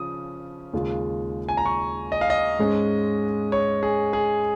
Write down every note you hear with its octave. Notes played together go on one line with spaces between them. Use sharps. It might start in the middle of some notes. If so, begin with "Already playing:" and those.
Already playing: C#3 F3 C#4 D#6
D#2 C#3 G#3 F4
G#5
A#5
C#6
D#5
F5
D#5
G#2 G#3 C#4
C#5
G#4
G#4